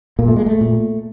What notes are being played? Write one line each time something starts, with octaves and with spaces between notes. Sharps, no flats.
A#2 A#3
A3
G#3
A3
A#2